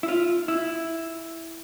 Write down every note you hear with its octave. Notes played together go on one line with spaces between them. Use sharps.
E4
F4
E4